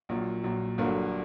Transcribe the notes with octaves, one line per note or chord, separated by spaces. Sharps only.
A#1 A#2 F#3
A#1 A#2 F#3
G1 G2 D3 F#3 A#3